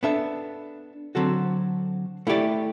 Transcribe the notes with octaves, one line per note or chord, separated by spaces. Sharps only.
B3 D4 A4 E5
D3 F#3 C4 F#4 A4
A3 E4 G4 D5